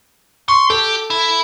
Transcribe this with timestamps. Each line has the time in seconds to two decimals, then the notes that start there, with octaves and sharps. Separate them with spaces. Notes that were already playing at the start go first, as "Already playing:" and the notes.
0.48 C6 C#6
0.70 G4 A4
1.10 E4